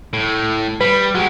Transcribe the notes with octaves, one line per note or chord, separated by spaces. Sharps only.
A2
G3 B4
F#3 G#3 G4